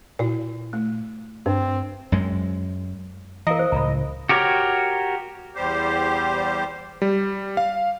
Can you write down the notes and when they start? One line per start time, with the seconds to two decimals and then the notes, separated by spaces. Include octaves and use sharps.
0.19 A#2 E4 F#4
0.73 A3
1.46 G2 C4 D4
2.12 F#2 G#3
3.47 E3 A#4 D#5 F5 A#5
3.59 C5
3.72 C#2 A2 A#5 B5
4.29 F#4 G4 A#4 C#5
5.55 E2 G3 G4 C5
7.02 G3
7.57 F5